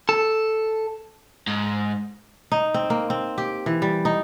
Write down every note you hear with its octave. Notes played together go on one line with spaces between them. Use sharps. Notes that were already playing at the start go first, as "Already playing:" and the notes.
A4
G#2
D#4
C4
A#3
C4
G4
E3
G3
D#4